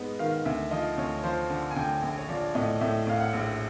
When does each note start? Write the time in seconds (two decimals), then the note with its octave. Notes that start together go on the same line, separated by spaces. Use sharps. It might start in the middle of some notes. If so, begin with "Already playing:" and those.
Already playing: G#2 G#3 B3 B4 D#5
0.19 D#3 F5
0.45 D2 E5
0.71 F3 D#5
0.97 D2 C#5
1.24 F3 C5
1.50 D3
1.71 G#5
1.76 D2 G5
2.02 A#1 G#5
2.18 C#5
2.28 F3 D5
2.55 A2 D#5
2.81 A2 E5
3.07 A2 F5
3.20 F#5
3.33 A#1